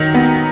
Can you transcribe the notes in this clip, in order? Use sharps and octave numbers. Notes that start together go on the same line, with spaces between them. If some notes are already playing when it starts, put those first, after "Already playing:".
Already playing: D#3 F#3 D#4
B3